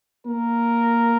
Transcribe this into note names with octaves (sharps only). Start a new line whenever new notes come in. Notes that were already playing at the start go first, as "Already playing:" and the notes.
A#3 A#4